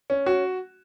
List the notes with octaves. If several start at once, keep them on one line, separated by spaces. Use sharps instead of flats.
C#4
F#4